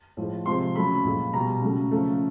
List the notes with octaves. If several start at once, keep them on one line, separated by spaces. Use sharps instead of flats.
A2 F3 G#3
C3 F3 G#3 C6
C#3 F#3 A3 B5
A#2 F3 G#3
B2 G3 A#5
C#3 F#3 A3
C#3 F3 A3